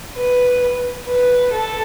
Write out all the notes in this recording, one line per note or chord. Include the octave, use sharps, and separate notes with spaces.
B4
B4
A4